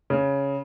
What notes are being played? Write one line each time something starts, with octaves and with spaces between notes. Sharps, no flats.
C#3